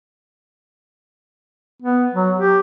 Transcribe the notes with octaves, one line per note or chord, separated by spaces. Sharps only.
B3
F#3
G4